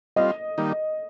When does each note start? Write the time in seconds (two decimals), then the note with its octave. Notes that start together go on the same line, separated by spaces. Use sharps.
0.16 G3 C4 F4 D#5
0.58 D#3 G3 A#3 D#4